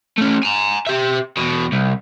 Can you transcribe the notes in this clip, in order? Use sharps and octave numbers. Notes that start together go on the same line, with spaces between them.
A3 C#4
G#5 A#5
G4 E5
E2 B2
C2